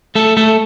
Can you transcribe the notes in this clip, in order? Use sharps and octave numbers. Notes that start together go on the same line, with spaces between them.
A3 A4
A3 A4